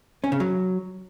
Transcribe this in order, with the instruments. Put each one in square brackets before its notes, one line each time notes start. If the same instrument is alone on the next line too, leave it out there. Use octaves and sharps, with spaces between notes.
[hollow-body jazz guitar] C#4
C#3
F#3